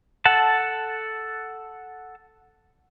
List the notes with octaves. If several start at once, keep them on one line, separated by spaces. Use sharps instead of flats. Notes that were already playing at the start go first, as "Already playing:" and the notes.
A4 F#5 A5